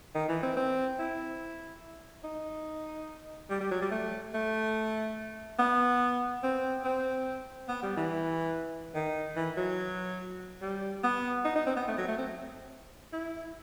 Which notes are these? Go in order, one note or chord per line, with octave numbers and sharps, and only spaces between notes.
D#3
E3
C4
C4
E4
D#4
G3
G3
F#3
G3
A3
A3
B3
C4
C4
B3
G3
E3
D#3
E3
F#3
G3
B3
D#4
D#4
C4
B3
A3
F#3
A3
C4
E4